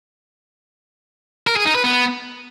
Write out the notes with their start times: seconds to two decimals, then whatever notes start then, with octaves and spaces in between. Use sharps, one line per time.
1.47 A#4
1.56 G#4
1.65 D#4
1.75 B4
1.84 B3